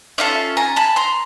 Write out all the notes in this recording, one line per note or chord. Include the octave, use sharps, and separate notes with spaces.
C#4 F4 A4 D5 E5
G#5 A#5
A5 B5
A#5 C6